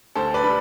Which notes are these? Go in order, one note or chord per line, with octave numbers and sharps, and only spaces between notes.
D2 A4 C5
B4 D5
D3 G3 B5